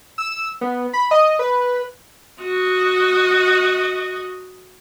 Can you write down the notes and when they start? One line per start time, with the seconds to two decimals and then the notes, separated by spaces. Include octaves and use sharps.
0.18 E6
0.61 B3
0.93 B5
1.11 D#5
1.39 B4
2.42 F#4 D#5